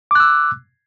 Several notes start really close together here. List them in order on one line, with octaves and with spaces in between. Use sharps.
D6 F#6 E6